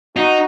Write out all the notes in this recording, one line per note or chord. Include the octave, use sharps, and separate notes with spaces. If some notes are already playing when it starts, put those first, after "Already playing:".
D#4 F#4